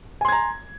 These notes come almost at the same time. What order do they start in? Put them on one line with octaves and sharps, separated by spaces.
G#5 C6 G#6 A#5